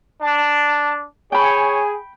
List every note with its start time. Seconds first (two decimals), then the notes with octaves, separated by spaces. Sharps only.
0.21 D4 A5
1.32 G#4 C#5 G5 G#5 B5